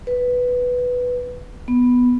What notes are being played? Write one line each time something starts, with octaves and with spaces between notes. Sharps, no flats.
B4
B3